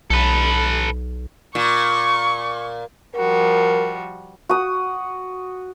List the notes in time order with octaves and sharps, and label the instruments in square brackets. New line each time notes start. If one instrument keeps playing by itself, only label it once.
[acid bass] B1 [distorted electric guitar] A4 B4
[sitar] A#2 [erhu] C#6
[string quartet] F3 G3 F#4 [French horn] A#4
[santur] F#4 D#6